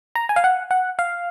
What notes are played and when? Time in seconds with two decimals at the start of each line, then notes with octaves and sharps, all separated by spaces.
0.15 A#5
0.29 G#5
0.36 F5
0.44 F#5
0.71 F#5
0.99 F5